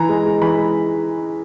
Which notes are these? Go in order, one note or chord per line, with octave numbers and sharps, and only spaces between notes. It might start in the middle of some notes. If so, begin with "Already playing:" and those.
Already playing: E3 A#5
G#3
G#3
E3 B5
G#3